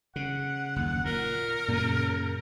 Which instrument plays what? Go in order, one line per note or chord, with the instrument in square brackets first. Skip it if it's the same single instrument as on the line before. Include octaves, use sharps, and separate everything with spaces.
[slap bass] C#3 [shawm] F#5
[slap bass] F#1 D#2
[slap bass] A#2 [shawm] A#4
[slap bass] F#2 C#3 [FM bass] A#2